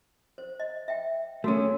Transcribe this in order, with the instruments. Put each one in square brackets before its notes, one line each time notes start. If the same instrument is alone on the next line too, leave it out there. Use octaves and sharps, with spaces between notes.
[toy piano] C5
D#5
E5 G5
[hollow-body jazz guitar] A3 C#4 [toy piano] F#4 A4 A#4